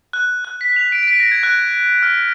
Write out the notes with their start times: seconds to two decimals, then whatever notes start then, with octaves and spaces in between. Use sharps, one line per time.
0.13 F#6
0.45 F#6
0.61 B6
0.76 F7
0.92 D7
1.03 D7
1.07 B6
1.20 A#6
1.31 G#6
1.43 F#6
2.03 F6